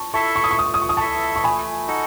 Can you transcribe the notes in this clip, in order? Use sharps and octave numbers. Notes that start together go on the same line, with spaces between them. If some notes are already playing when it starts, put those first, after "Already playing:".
Already playing: A5 C#6
E4 A4 E5 A5 C#6
C#6
D#6
C#6
A3 D#6
C#6
D#6
C#6
D#6
E4 A4 E5 A5 C#6
C#6
A3 G#5 B5
D#4 F#4 A4